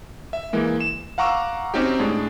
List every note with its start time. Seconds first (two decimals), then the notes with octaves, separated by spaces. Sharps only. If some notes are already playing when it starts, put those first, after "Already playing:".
0.33 E5
0.53 E3 G#3 A#3
0.81 E7
1.18 F5 F#5 A#5 C#6 D6 E6
1.74 C4 C#4 D#4 F#4 G4
1.99 A2 G#3 D4